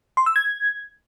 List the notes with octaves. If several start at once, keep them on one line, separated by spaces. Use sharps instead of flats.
C6
E6
G#6